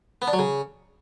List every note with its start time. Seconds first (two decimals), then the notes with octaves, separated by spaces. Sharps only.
0.22 B3
0.27 D4
0.33 F#3
0.39 C#3